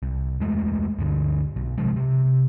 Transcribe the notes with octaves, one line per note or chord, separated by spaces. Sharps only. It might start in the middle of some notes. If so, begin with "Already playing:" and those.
C2
E2 G#3 A3
D2 G2 D3
B1
C3 F3 G#3
C3